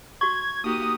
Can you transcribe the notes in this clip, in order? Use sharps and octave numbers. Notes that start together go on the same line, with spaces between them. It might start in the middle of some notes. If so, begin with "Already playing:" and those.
F#4 C#6 G#6
A#3 D#4 F#4 G4 D#6